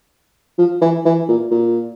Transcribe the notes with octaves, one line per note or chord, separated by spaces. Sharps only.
F3
E3
E3
A#2
A#2